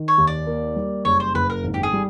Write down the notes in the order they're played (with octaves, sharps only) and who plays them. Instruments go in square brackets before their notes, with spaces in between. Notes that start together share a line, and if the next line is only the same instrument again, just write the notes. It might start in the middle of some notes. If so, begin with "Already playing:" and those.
Already playing: [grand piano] D#3
[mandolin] C#5
[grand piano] D#2
[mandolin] D5
[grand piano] A#3
G3
[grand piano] F#1 [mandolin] C#5
[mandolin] C5
[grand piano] F#1 [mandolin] B4
[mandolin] A#4
[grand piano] G#1
[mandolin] G4
G#4
[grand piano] G3